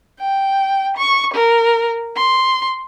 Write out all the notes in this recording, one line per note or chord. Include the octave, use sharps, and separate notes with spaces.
G5
C#6
A#4
C6